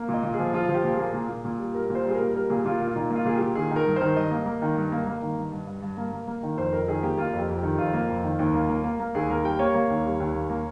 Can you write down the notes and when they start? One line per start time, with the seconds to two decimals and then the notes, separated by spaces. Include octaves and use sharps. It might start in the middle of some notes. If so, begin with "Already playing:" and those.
Already playing: A#3
0.09 A#2
0.14 D#5
0.23 A#2
0.34 G#4
0.39 F3
0.54 F3 F4
0.69 F3
0.74 G4
0.84 A#2
0.94 G#4
0.99 A#3
1.14 A#2
1.29 A#2
1.44 A#2
1.59 G3
1.75 G3 A#4
1.90 A#2
1.95 C5
2.05 G3 G#4
2.15 A#4
2.20 A#3
2.35 G3 A#4
2.50 A#2 G#4
2.65 A#2 F4
2.80 A#3
2.87 F4
2.95 A#2 D#4
3.10 A#3
3.15 F4
3.25 A#2 G#4
3.35 G4
3.40 A#2
3.55 D#3 G#4
3.71 D#3
3.76 A#4
3.86 G2
3.96 D#3 C5
4.16 G2 D#5
4.31 A#3
4.46 A#3
4.62 D#3
4.76 G2
4.92 A#3
5.07 A#3
5.22 D#3
5.37 G2
5.52 G2
5.67 G2
5.82 G2
5.97 A#3
6.12 A#3
6.27 A#3
6.43 D#3
6.57 F2 C5
6.72 F2 A#4
6.88 D#3 G#4
7.03 A#3 G4
7.17 A#3 F4
7.33 F2
7.39 G4
7.48 F2
7.58 D#3 G4
7.78 F2 F4
7.94 A#3
8.09 F2
8.24 D#3
8.39 D#2
8.54 A#3
8.69 A#3
8.84 A#3
9.00 A#3
9.14 D#2 G#4
9.30 A#3 A#4
9.44 G3 G5
9.59 A#3 C#5
9.74 A#3
9.90 D#2
10.05 G3
10.20 D#2
10.35 A#3
10.50 A#3